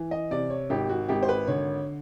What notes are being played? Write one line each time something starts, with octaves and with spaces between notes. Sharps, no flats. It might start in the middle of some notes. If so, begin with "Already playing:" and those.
Already playing: E3
D#5
C3 D5
C#5
G#1 G4
F#4
G#1 G4
C5
B4
D3 C#5